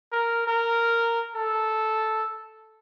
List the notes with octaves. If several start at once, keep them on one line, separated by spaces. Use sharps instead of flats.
A#4
A#4
A4